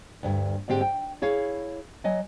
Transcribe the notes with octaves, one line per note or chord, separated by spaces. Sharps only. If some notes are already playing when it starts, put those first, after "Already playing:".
D2 G2
G#2 D3 C4 G4
G5
E4 G#4 C#5 F5
F#3 D#5 G#5